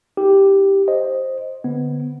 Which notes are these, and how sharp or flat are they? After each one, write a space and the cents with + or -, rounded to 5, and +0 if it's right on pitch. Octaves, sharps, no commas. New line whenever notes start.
D#4 +40 G4 +0
C5 +10 D#5 +0
D3 +0 B3 +0